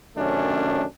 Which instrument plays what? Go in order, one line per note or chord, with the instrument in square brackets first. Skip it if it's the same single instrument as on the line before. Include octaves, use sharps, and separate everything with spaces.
[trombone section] F#2 C3 D#3 A3 C#4 D4